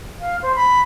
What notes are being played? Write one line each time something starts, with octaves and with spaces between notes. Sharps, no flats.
F5
C5
B5